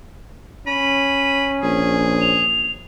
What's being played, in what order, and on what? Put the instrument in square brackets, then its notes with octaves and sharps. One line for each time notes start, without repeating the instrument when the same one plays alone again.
[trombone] C#4 [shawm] B5 [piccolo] D#7
[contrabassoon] A#1 [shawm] G#4 [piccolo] G#5
[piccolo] F7